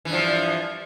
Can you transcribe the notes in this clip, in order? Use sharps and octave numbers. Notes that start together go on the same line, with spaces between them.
G2 E3 F3